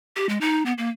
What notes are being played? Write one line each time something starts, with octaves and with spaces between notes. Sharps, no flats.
G4
G#3
D#4
B3
A#3